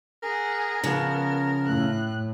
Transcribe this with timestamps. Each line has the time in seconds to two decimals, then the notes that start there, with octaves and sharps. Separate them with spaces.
0.23 G#4 A#4 F#5
0.84 C#3 F3 B3
1.66 A2 F#6